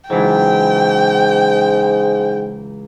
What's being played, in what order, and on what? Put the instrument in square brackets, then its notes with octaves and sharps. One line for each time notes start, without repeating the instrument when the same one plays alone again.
[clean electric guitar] C#2 E3 F#3 [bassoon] G#2 [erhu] G5